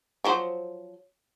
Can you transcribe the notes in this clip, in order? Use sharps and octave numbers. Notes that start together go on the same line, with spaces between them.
F3 F#3 C5